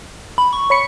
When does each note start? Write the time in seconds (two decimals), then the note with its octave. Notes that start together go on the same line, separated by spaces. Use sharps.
0.38 B5
0.53 C#6
0.70 C#5 B5 C#7